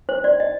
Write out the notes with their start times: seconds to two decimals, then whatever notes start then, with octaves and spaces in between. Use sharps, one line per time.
0.09 C5
0.24 D5
0.40 D#5